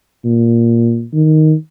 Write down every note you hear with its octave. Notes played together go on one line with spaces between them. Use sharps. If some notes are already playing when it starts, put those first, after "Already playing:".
A#2
D#3